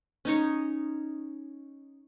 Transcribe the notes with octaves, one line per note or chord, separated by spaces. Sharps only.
C#4 D#4 C#5